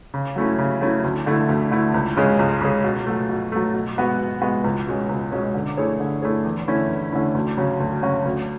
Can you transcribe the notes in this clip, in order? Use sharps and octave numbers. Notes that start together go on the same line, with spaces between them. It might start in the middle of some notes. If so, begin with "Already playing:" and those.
C#3
F#3 A3 C#4 E4
C#3
F#3 A3 C#4 E4
D2
D3 A3 E4
D2
D3 A3 E4
C#2
C#3 G#3 C#4 G#4
C#2
C#3 G#3 C#4 G#4
B2
F#3 A3
B2
F#3 A3
B2
G#3 B3 F#4
B2
G#3 B3 F#4
C#2
B2 G#3 C#4
C#2
B2 G#3 C#4
D3
A3 E4 G#4 C#5
D3
A3 E4 G#4 C#5
E2
D3 A3 C#4 E4
E2
D3 A3 C#4 E4
D2
C#3 F#3 C#4 F#4
D2
C#3 F#3 C#4 F#4
D2